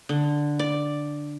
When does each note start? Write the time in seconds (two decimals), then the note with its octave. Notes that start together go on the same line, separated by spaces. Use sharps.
0.09 D3
0.59 D5